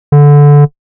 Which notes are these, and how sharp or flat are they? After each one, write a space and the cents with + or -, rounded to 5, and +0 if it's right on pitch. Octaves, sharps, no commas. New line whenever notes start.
D3 -15